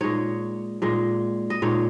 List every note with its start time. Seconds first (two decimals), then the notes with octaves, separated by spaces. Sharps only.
0.01 A#2 G#3 D#4 C#5
0.82 A#2 G#3 D#4
1.50 D#5
1.62 A#2 G#3 D#4 C#5